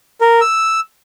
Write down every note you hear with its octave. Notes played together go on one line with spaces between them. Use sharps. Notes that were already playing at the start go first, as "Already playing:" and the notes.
A#4
E6